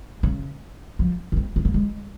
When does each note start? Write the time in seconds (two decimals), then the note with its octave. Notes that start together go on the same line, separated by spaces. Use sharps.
0.23 C#3
0.99 F3
1.32 C#4
1.37 C4
1.56 C4
1.65 A#3
1.74 G#3